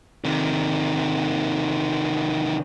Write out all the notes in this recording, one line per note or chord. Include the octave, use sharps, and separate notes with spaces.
C3 D#3